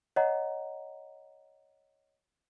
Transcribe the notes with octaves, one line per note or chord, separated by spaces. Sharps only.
C#5 D#5 F#5 A#5